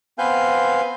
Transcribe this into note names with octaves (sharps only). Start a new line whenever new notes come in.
B3 C4 B4 F5 G#5 G6